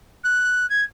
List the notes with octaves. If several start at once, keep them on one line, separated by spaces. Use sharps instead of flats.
F#6
G#6